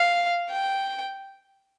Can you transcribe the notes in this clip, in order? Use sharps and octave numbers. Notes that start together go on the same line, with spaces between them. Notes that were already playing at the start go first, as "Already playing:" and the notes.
Already playing: F5
G5